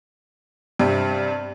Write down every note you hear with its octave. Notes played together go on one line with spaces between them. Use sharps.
G2 C3